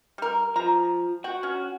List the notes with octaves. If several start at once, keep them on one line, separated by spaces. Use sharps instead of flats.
G3 A#4
F3 A#5
F#4 G5
C#4